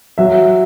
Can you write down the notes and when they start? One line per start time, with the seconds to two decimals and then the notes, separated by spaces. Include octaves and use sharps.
0.18 F#3 E5